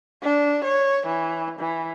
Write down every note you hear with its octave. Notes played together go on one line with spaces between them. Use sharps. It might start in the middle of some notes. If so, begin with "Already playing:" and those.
D4
C#5
E3
E3